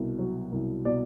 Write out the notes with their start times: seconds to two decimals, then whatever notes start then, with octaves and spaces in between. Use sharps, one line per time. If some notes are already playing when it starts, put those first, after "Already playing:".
Already playing: C2 B2
0.19 F#3
0.52 C2
0.85 B2 D5